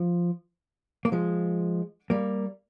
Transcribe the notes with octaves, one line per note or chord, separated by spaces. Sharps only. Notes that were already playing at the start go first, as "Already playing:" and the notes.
Already playing: F3
A#3
F3 G#3
G3 A#3